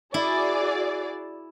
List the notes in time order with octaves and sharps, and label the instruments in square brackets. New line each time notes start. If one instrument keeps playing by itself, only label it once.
[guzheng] E4 [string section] F#4 G#4 D5